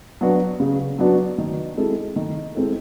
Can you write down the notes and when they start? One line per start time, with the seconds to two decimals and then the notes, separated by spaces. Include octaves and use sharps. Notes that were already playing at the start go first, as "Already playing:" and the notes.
0.21 F#3 B3 D4 F#4
0.60 C#3
0.98 F#3 B3 D4 F#4
1.38 D#3
1.77 G#3 C4 E4 A4
2.16 D#3
2.55 G#3 C4 E4 A4